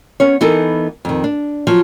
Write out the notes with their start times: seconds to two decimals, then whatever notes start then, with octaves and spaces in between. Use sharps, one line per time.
0.20 B3 C#4 C#5
0.41 E3 B3 D#4 A4 A#4
1.05 F2 D#3
1.24 D4
1.67 F3 F#3